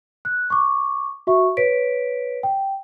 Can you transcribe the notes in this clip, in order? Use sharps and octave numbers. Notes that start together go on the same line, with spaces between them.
F#6
C#6 D6
F#4 E5 C#6
B4 C#5 B6 D7
G5